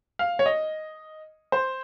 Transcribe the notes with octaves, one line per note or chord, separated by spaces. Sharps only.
F5
C#5
D#5
C5